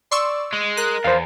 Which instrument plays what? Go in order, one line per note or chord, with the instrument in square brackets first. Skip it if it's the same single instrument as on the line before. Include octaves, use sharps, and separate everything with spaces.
[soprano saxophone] D5 [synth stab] C6 C#6 E6
[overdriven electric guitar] G#3
[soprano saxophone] A#4 [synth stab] F#6
[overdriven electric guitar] E2 [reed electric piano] C5 F5